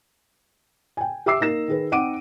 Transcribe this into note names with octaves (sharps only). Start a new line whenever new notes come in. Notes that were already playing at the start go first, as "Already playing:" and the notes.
G5 G#5
G4 E5 D6 E6 C7
A#3 D#4 A#6 E7
D#3 G#4 B4
C4 D#4 F#5 D6 D7 D#7